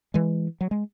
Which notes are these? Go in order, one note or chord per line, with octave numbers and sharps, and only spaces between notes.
E3 G#3
F#3
G#3